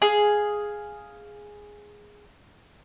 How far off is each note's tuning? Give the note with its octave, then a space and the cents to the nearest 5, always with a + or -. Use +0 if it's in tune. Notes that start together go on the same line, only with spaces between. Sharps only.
G#4 +0 F5 +0